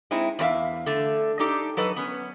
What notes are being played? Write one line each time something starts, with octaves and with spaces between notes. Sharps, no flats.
G#3 C4 D#4 E4
E2 F#3 C4 E5 F5
D3 A3
D4 D#4 G4 A4
F#3 A4 B4 D#5
B3 C#4